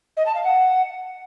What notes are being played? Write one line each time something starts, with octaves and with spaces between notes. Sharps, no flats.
D#5
A5
F5
F#5